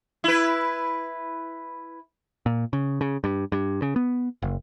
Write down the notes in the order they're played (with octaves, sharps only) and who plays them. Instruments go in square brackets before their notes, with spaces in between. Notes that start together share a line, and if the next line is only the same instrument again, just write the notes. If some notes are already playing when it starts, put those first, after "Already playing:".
[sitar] E4 B4
[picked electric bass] A#2
C#3
C#3
G2
G2
C#3
B3
F#1